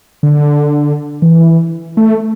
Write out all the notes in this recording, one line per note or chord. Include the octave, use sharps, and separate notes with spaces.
D3
E3
A3